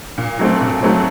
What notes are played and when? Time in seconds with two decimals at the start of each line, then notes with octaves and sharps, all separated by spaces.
0.18 A#2
0.39 F#3 A3 C4
0.61 A#2
0.83 F#3 A3 C4